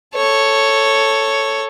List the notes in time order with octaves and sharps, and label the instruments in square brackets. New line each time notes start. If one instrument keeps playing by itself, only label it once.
[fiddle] A4 C#5